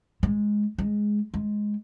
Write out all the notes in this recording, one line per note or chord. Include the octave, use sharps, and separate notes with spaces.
G#3
G#3
G#3